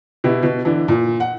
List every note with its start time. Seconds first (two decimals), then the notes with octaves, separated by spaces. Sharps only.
0.24 B2 E4 G4
0.43 B2
0.65 D3 E3
0.88 A#2
1.20 F#5